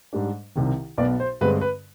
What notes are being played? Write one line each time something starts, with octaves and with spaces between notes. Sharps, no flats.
G#2 G3 D4
C2 C3 D#3
B1 B2 B3 D5
C5
G2 D3 G#3 C4 B4
B4